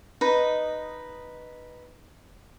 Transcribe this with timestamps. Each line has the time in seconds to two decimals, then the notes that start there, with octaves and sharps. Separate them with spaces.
0.21 D#4 B4 D#5